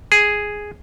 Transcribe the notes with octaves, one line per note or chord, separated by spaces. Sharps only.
G#4